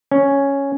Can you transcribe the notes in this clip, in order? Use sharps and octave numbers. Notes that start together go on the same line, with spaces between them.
C#4